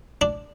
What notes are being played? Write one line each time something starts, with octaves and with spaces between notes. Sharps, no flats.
D4